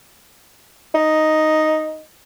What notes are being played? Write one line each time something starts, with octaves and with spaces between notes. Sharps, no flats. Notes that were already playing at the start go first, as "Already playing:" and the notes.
D#4